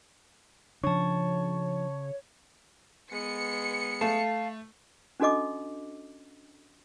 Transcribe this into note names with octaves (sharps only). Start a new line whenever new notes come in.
C#3 F3 D4 C#5 A5 C#6
G#3 B3 C#7
A3 F5 A5
C#4 D4 F#4 A4 D#5 D6